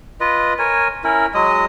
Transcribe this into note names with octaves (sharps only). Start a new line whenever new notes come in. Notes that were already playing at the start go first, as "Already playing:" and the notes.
F4 B4 D#5
A#4 C#5 G#5
C#4 E4 A#4
F#3 G#3 D#5 D#6